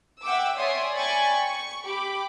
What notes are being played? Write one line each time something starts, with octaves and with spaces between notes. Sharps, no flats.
E5 F#5 G5 D6 E6
C#5 D5 E5 G#5 C6 D#6
D5 G5 G#5 B5 C#6 A6
C#6
G4 B5 D6